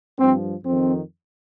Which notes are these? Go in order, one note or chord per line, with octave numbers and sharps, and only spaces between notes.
G2 F3 C4
F2 D#3 C4